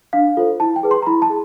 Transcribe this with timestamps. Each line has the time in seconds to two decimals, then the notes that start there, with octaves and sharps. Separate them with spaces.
0.13 D4 F5
0.37 F4 A4 C5
0.60 E4 A5
0.76 G5
0.83 G#4 B4
0.91 C6
1.02 A#5
1.07 E4 B5
1.22 A5
1.30 G#4